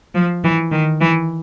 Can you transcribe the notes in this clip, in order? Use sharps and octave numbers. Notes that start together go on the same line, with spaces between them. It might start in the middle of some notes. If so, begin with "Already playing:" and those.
F3
E3
D#3
E3